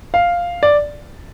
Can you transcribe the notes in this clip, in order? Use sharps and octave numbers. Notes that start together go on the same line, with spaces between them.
F5
D5